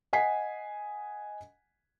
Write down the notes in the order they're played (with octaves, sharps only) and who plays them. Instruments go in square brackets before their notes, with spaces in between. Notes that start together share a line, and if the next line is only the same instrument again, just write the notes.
[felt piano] D#5 F#5 G#5 B6 C7